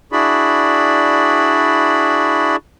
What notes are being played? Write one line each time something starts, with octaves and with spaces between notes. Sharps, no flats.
D4 E4 F#4 G#4 D5 B5